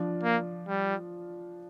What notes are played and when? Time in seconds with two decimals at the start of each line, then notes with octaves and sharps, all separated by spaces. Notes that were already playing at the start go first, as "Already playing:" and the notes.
Already playing: F3 D4 F4 D5
0.23 A#3
0.68 G3